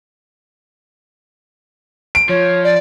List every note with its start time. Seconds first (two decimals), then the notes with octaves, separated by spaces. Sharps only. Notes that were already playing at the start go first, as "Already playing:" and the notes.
2.15 D7
2.29 F3 C#5
2.64 D5